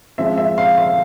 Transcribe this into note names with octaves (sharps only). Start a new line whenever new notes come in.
F3 G#3 C4 E5
E5
F5
F5